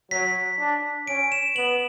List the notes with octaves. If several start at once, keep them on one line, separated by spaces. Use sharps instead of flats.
F#3 B6
D4
C#4 D7
E7
B3 F#7